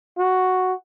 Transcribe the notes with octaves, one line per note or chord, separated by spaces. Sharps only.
F#4